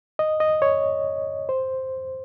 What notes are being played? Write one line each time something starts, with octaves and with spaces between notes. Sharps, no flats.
D#5
D#5
C#5
C5